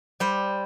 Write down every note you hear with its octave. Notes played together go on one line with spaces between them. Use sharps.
G3 C5